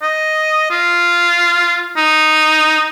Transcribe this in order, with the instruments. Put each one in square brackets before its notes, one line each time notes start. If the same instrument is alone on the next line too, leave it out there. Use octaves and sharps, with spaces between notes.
[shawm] D#5
F4
D#4